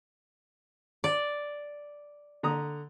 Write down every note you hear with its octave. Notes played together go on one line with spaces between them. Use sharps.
D5
D3 A#5 D#6